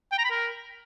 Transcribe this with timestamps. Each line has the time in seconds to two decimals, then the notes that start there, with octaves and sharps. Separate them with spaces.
0.12 G5
0.18 A#5
0.24 B5
0.31 A#4